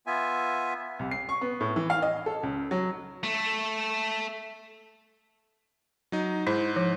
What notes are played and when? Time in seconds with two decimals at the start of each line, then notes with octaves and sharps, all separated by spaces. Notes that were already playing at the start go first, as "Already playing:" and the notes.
0.07 B3 F4 E5 G#5
0.99 C2
1.11 C7
1.29 C#6
1.41 B3
1.61 A2
1.76 E3
1.90 F5
2.02 D#5
2.26 A4
2.43 C#2
2.71 F#3
3.23 A3
6.12 F#3 D#4
6.47 G#2 E4 C5
6.76 F3